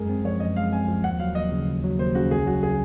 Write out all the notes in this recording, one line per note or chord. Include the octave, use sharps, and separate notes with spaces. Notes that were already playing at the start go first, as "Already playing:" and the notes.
Already playing: F#2 G#3 G#4 A#4
C4
F3 C#5
F#2 D#5
G#3 F5
C4 G#5
F3
D#2 F#5
F#3 F5
D#2 D#5
C#3
D#2
F#3
D#2 C5
C#3 F#4
C2 G#4
F#3 F#4
G#4